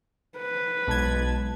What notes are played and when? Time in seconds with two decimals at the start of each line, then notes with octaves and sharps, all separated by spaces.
0.37 B4
0.88 B1 B2 G#3 A5 G#6